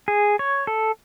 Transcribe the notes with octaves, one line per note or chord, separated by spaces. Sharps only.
G#4
C#5
A4